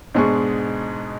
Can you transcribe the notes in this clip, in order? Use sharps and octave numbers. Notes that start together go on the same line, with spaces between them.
G#2 B2 G#3 D4 G#4 C#6